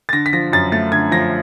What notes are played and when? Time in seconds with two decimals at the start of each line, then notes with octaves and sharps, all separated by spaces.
0.09 A6
0.13 D3 A#6
0.26 B6
0.33 F3 A#6
0.52 F#2 A6
0.72 A3 A6
0.92 D3 G#6
1.11 F3 A#6